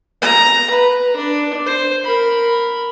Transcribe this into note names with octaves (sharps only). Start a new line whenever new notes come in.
A#5
B4
D4
C5
A#4 B5